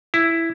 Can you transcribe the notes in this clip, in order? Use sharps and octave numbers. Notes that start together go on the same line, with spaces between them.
E4